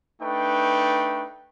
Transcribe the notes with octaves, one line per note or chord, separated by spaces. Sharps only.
A3 D4 D#4 B4 G5